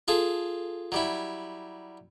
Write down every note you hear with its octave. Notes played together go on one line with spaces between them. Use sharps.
F4 G#4 A4
F#3 G3 E4